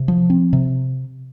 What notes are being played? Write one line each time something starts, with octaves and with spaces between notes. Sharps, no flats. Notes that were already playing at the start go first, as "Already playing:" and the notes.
Already playing: C3
F3
C4
C3